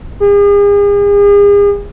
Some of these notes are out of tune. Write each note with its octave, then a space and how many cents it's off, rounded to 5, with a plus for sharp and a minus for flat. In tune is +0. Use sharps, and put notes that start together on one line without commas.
G#4 -40